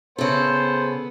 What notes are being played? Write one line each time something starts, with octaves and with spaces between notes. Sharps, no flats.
C#3 B3 A4 C5